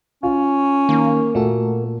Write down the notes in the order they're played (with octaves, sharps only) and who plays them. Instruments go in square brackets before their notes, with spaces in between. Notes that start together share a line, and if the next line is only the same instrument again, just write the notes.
[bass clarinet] C#4 [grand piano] F4
[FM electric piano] D#3 [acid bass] A#3
[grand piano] A#2 [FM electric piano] A3 F#4 A4